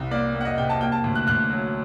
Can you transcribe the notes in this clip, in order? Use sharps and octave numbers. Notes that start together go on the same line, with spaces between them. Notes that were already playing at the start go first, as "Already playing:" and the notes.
Already playing: C2
A#3 D5
A#3
F#5
D#5
C3 G5
A5
A#3 G5
A5
D2
F#6
D2 F#6
F#3